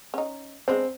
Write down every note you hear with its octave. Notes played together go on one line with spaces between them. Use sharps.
C#4 D#4
G#3 B3 C4 D4